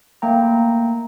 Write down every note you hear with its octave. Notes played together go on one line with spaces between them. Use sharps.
A3 A#3 G5 A#5